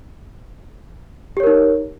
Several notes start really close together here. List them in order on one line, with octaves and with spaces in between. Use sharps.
G4 C#5 A#4 D#4